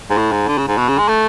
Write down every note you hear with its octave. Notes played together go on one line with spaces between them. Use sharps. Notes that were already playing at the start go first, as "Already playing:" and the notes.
G#2
A2
G#2
D3
C#3
G#2
B2
C#3
G#3
A3